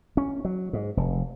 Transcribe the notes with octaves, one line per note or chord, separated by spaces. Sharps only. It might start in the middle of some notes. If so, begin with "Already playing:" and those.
C#4
F#3
G#2
F1